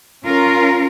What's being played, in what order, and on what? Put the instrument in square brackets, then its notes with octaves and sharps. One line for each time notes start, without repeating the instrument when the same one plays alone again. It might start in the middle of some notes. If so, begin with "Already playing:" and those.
[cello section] C#4 F4 A#4